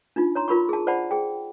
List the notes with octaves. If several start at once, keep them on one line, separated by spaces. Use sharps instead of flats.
D4 D#4 F4
C#5 A#5 C6
F4 A#4 B5 C#6
G#4 A5
C5 D5 F#5 A5 B5
G#4 G5